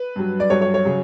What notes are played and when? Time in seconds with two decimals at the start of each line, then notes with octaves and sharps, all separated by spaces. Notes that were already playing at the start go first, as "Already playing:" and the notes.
Already playing: B4
0.16 G2 F#3
0.40 D5
0.50 G2 F#3 C#5
0.61 C#5
0.74 C#5
0.85 C#3 F#3